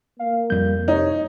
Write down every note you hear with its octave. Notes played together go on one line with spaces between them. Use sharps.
A#3 F5
F2 G3 G6
C3 D#4 C#5